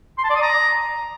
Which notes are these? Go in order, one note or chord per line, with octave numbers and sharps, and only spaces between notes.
C6
A5
D5
D#6
A#5